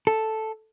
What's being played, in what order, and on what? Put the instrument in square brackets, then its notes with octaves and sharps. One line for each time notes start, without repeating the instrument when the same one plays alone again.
[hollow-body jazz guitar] A4